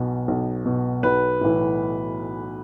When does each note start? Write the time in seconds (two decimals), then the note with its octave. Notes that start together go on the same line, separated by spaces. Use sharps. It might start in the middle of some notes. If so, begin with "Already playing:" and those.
Already playing: B1 B2
0.28 B1
0.65 B2
1.03 B1 B4
1.41 A2 E3